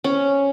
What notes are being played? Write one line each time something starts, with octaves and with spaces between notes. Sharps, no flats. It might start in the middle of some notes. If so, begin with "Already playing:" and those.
C#4